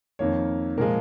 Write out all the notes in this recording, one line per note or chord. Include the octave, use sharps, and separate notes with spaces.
F2 D#3 A#3 C#5
A#2 F3 G#3 A#4